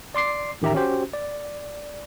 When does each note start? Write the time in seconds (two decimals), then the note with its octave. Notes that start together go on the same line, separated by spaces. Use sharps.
0.15 D5 C6 D6 C7
0.62 A1 D#3 G4 E5 A#5
0.74 C#4 F#4 G4 C5
1.13 D5